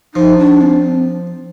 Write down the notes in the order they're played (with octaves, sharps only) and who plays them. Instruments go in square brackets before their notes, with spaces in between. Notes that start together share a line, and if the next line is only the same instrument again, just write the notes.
[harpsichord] F3 [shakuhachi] D#4
[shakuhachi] D4
C4